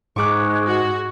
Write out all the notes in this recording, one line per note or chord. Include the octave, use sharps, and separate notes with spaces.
G#2 G#3 C#6 D6 F#6
F#4